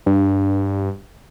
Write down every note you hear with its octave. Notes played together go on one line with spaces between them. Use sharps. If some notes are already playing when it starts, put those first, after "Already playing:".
G2